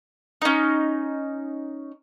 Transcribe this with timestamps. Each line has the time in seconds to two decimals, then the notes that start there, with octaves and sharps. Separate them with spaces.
0.41 C#4 D#4